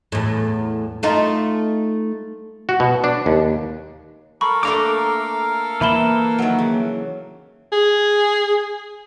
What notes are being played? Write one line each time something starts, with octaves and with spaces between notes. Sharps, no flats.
E2 A2
A3 D#4 F4
F#4
B2
D4
D#2
A4 A#4 F5 B5 C#6
A3 A#3 D4 A#5 D6
E3 A#3 E5 A5 B5 G7
D#3 F#3
C#3
G#4